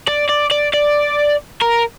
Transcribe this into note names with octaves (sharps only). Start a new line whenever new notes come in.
D5
D5
D5
D5
A#4